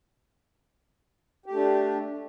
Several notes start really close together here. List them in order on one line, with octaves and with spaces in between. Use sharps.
G4 A3 D4